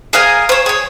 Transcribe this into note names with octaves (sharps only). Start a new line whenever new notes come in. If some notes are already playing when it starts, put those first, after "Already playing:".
G#4 A#4 F5 G#5
C5 C#5
G#4 C#5